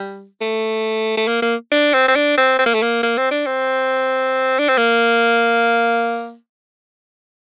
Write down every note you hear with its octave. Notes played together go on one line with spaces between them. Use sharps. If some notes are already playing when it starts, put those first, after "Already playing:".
Already playing: G3
A3
A3
A#3
A#3
D4
C4
C4
D4
C4
C4
A#3
A3
A#3
A#3
C4
D4
C4
D4
C4
A#3